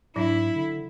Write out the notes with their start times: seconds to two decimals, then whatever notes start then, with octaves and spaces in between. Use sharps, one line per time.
0.16 G#2 F#3 D4 E4
0.56 D3